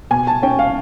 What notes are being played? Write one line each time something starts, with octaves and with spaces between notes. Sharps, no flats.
B2 G#5
A5
C#4 G5
F5